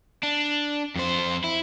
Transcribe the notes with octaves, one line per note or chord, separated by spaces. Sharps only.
D4
F2 C5
E4